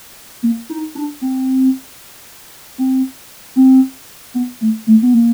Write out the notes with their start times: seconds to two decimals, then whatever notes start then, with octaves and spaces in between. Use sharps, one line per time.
0.43 A#3
0.70 D#4
0.95 D4
1.21 C4
2.78 C4
3.56 C4
4.34 B3
4.61 A3
4.87 A3
5.02 B3
5.13 A#3